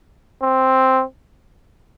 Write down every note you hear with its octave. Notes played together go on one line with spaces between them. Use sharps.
C4